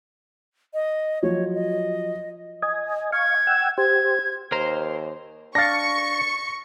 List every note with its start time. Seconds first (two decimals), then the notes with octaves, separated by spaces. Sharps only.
0.74 D#5
1.23 F3 F#3 C#5
1.55 D#5
2.62 D#5 G#5
3.13 F5 C#6 G#6
3.47 F#5 G5 E6
3.78 G4 C5 G#6
4.52 D#2 A#4 C5 A#5
5.55 D4 F5 C#6 A6 A#6 C#7